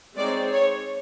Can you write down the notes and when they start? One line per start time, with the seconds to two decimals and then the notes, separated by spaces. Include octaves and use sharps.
0.17 G#3 C4 D#4 G#4 C#5 D5
0.52 C#5